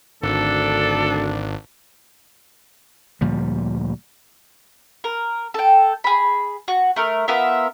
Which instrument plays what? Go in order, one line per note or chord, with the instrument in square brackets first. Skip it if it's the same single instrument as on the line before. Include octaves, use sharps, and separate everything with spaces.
[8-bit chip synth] G#1 [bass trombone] D2 [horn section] D4 [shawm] A4
[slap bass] D2 A#2 F3 G3
[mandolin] A#4
A4 G5
G#4 B5
F#4
A3 A#4
B3 F4 A#4 E5